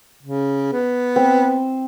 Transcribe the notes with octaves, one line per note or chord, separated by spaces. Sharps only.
C#3
B3
C4